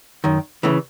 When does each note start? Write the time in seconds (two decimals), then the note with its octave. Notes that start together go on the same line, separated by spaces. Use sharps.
0.24 F#2 D#3
0.63 C#3 E3 A3